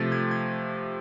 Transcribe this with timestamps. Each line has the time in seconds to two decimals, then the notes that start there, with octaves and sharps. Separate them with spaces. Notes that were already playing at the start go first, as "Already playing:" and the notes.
Already playing: C3 F3 A3 A6
0.12 G#6
0.31 G#6